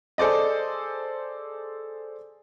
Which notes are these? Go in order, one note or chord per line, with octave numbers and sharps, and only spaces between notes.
G#4 A4 C5 D5 D#5